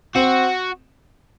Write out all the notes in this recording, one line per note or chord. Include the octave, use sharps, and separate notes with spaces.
C4 F#4